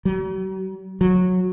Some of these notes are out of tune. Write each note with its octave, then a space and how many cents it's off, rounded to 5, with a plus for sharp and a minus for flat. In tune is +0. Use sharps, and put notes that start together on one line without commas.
F#3 +45
F#3 -15